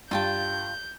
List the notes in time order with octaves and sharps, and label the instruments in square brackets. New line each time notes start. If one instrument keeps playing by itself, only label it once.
[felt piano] G2 [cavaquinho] F4 G5 A5 [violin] G6